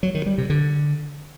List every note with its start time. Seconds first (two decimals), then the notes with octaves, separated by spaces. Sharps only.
0.03 F#3
0.15 D#3
0.26 G3
0.38 C3
0.50 D3